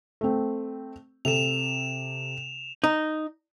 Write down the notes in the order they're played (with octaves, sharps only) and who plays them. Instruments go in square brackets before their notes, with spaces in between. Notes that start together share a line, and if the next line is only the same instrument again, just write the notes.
[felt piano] A3 C4
[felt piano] C3 A4 [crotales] E7 F7
[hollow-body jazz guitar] D#4